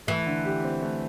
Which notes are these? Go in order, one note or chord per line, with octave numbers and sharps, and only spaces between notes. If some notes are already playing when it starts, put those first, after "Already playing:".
E3 A3
D3
G4
C4
A3